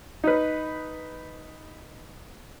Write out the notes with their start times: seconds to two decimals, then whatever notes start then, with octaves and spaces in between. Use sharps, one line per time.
0.24 D#4 B4